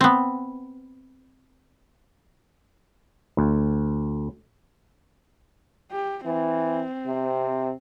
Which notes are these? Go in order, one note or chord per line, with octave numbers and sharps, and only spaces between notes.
B3 C4
D2
G4
E3 C4
C3